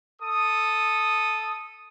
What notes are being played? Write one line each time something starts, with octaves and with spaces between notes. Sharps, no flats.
A4 D#6